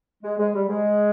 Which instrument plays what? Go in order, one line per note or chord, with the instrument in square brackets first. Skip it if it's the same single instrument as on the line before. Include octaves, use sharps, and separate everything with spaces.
[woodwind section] G#3
G#3
G3
G#3